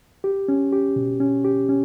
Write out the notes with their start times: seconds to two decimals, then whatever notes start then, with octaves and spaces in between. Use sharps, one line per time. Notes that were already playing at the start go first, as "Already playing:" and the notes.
0.24 G4
0.48 C#4
0.72 G4
0.96 B2
1.20 C#4
1.44 G4
1.69 C#4